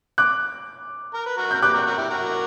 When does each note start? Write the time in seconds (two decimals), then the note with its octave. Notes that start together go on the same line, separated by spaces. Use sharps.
0.18 D6 F#6
1.14 A#4
1.26 B4
1.37 F#4 A#4
1.51 A#4 G6
1.62 G4 B4 D6 F#6
1.74 F#4 A#4
1.86 F#4 A#4
1.98 E4 G4
2.10 F#4 A#4